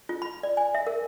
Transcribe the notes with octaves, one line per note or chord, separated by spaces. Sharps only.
F4
B5
D5
G#5
E5
A#4